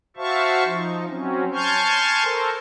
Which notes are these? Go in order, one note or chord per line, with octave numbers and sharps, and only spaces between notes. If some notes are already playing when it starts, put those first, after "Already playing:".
F#4 C5 E5 F5 A5 C#6
F3 D#4
F#3 C4 C#4
G#5 A5 C6 C#6 F6 G6
A4 A#4 C5